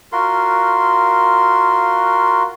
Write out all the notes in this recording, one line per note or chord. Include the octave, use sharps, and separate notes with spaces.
F4 F#4 A#4 C6